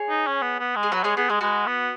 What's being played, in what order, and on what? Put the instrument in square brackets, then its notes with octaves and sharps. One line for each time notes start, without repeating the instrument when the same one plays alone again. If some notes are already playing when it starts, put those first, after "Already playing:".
Already playing: [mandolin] G#4 C#5
[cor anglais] D#4
C#4
B3
B3
G#3
[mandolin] G#4
[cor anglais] F#3 [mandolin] F#4 B4
[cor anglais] G#3 [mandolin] G#4 C#5
[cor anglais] B3 [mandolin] G#4
[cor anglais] G#3 [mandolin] G#4
[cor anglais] G#3 [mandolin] F#4 B4
[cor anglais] B3